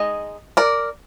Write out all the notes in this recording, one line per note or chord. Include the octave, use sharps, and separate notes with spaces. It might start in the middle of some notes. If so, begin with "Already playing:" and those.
Already playing: G#3 D#4 D#5
A#4 D5